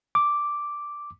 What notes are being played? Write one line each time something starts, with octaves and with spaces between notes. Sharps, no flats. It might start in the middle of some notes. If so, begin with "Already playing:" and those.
D6